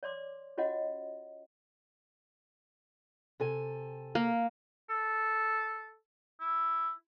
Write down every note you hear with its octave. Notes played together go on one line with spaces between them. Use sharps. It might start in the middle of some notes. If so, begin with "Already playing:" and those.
C#5 D5 C6 D6
C#4 F4 F#4 C#5 D#5 F#5
C3 A4 G#5
A#3
A4
E4